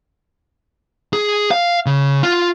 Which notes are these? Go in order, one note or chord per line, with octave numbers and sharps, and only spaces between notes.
G#4
F5
C#3
F4